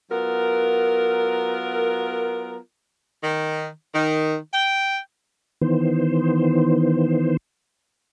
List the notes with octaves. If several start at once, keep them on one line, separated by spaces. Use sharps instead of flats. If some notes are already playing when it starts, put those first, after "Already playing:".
F#3 B3 F4 A#4
D#3
D#3
G5
D#3 E3 B3 C5